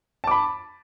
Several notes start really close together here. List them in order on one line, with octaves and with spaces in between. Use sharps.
A5 D6 B5